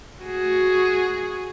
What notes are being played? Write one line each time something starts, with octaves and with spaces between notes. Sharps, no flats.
F#4 G#4